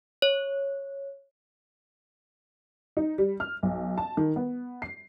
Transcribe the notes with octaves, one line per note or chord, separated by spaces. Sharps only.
C#5
D#4
G3
F6
B1
A5
D#3
B3
C7